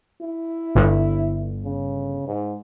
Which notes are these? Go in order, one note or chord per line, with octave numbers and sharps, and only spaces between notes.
E4
G1
C#3
G#2